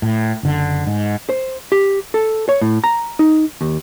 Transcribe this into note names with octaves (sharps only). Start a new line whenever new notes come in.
A2
F#1 D3
G#2
C5
G4
A4
C#5
A2
A#5
D#4
D#2